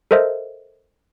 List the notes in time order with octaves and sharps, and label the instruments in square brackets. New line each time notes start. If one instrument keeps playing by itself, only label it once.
[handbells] A4 A#4 C5 D#5 E5